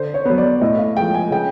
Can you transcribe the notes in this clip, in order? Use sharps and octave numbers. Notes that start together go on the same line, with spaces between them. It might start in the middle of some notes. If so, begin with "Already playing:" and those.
Already playing: D3 C5
C#5
F#3 B3
D5
A2 D#5
F5
F3 G#3 G5
G#5
C#3 G5